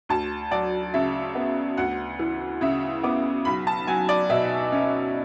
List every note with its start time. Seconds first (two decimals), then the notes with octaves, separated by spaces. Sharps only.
0.09 D2 A5
0.51 F#3 D5
0.94 C#3 E5
1.35 B3
1.78 D2 F#5
2.19 E3
2.61 C#3 E5
3.03 B3 D6
3.45 B1 B5
3.67 A5
3.87 F#3 G#5
4.09 D5
4.30 B2 E5
4.72 C#4